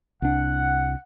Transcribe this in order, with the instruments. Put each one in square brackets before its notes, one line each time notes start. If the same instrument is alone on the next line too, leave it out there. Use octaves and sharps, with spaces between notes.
[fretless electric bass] C2 D4 [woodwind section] F#5